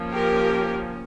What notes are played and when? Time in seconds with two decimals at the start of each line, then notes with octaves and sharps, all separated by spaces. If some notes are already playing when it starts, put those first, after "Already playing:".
Already playing: F3 A#3 C#4
0.12 G4 A#4